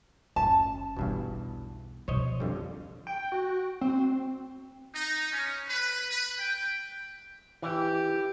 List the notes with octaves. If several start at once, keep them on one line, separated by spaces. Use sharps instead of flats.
F#1 C#4 A5
B1 E2 G2 B2
B2 F3 C5 C#5 D#5
F2 D3 G3
G5
F#4
C4
D#4
C#4
B4
B4
G5
E3 G4